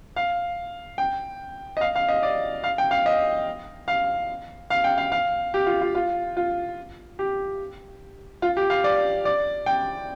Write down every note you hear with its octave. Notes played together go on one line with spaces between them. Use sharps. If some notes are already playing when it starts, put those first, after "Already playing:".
F5
G5
D#5
F5
F5
D#5
D5
F5
G5
F5
D#5
F5
F5
G5
F5
F5
G4
F4
F4
F4
F4
G4
F4
G4
F5
D5
D5
G5